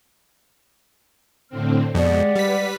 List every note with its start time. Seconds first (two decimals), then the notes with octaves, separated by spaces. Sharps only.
1.49 A2 D3 C4 F6
1.95 F2 B2 G#3 G4 D5 F#5
2.36 G3 B4 B6